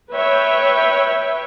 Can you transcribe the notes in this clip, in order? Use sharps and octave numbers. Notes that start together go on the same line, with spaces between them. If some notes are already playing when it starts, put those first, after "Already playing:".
B4 C#5 E5 G5